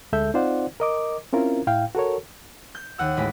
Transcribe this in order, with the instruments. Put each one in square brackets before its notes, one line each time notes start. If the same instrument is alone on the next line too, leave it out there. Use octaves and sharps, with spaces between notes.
[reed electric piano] D2 G#3 A4 E5 G6
C4 D#4 F4 C5 D5 F#5
A#4 D#5 D6
C4 C#4 E4 F4 A#4
A2 E4 F5 G5
F#4 A4 A#4 C#5
[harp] G6
D#2 F#5 E6
A1 G#3 B5